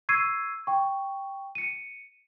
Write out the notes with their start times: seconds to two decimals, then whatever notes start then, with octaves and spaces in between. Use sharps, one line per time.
0.09 C#6 E6 G#6 C7 D#7
0.67 G5 C#6
1.55 C#7 D#7